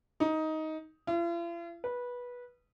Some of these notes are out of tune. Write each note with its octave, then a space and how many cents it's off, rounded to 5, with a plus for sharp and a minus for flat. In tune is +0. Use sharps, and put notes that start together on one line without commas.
D#4 +15
F4 -45
B4 -15